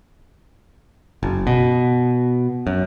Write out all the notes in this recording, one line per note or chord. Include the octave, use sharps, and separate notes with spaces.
F#1
B2
F#2